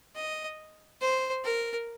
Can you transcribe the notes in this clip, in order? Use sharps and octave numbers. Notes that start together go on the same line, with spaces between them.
D#5
C5
A#4